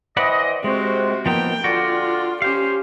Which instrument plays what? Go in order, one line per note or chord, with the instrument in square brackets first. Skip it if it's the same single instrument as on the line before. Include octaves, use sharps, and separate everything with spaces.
[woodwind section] E3 C4 D#5 [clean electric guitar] D5 F#5 B5
[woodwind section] C3 F#4 [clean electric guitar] G#3 [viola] C4
[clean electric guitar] F3 B3 D#4 [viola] A#3 G5
[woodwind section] D3 D5 [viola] F4 [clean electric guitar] F#4
[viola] C#4 G4 [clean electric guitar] C5 F5